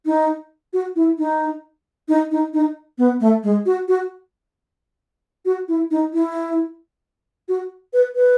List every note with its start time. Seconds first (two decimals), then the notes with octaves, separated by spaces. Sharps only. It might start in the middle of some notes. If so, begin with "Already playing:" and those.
0.06 D#4
0.73 F#4
0.96 E4
1.18 D#4
2.08 D#4
2.31 D#4
2.54 D#4
2.98 B3
3.20 A3
3.43 G#3
3.66 F#4
3.88 F#4
5.45 F#4
5.68 E4
5.91 D#4
6.13 E4
7.48 F#4
7.93 B4
8.16 B4